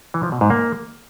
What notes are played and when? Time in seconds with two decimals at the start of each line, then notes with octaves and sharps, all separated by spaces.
0.14 E3
0.23 F3
0.32 B2
0.41 G#2
0.50 A#3